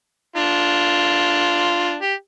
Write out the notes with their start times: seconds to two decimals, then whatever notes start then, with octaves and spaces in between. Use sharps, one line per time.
0.36 D4 F4
2.02 G4